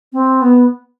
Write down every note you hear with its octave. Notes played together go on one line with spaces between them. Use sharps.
C4
B3